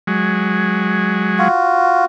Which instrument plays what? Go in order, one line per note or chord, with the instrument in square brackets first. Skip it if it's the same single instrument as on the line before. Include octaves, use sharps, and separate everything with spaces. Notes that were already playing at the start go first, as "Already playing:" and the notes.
[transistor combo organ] F#3 G#3
[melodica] F4 F#4